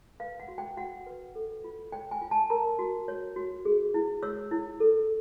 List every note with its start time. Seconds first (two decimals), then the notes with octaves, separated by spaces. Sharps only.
0.20 B4 F5
0.40 F#5
0.48 F#4
0.58 G5
0.77 F#4 F#5
1.06 B4
1.35 A4
1.64 F4
1.92 C#5 G5
2.11 G#5
2.21 F4
2.31 A5
2.50 A#4 A#5
2.79 F#4
3.08 C#5
3.36 F#4
3.65 G#4
3.94 E4
4.23 C#5 E6
4.51 E4
4.80 A4